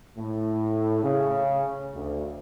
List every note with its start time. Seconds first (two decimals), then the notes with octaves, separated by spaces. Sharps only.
0.17 A2
1.03 C#3
1.93 D2